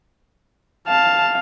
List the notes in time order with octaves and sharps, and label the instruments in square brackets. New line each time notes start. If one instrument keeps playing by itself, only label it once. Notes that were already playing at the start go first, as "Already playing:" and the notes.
[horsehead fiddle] F5 [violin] A5